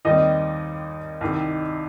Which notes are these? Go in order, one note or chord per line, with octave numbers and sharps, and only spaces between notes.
D#2 D#3 G3 C4 D#4 D#5
C2 C3 D#3